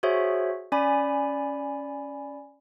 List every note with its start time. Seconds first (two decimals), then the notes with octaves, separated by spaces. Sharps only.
0.03 F#4 G#4 C5 C#5 E5
0.72 C#4 D5 G#5 B5